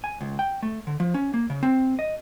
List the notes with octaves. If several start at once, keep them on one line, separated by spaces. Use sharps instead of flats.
G#5
C#2
G5
A3
D3
F3
C#4
A#3
C#3
C4
D#5